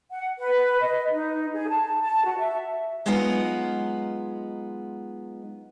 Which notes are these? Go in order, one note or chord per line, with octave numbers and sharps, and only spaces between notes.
F#5
B4
D#5
D#4
G#4
A5
A5
F#4
E5
F#3 G#3 B3 D#4 F4 F#5